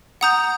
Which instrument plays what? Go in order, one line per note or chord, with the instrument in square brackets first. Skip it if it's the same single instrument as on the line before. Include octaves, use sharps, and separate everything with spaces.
[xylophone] F#5 A#5 D#6 G6